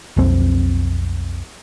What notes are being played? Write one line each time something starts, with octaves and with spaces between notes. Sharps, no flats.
B1 F2 C4